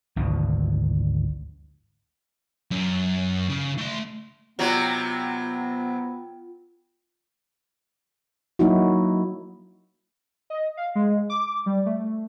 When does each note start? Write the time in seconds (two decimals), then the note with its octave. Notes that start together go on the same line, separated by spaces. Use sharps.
0.16 G#1 D2 B2 D3
2.71 F#2
3.50 C#3
3.78 A3 C6
4.59 C3 F#3 B3 F4 G5
8.59 F#3 A#3 D#4 E4 F#4
10.50 D#5
10.77 F5
10.95 G#3
11.30 D6
11.66 G3
11.86 A3